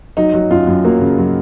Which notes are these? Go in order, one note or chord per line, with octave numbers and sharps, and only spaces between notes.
F#3 D#4
F#3
F#2 F4
F#2
F#3 A#3
C#3
F#3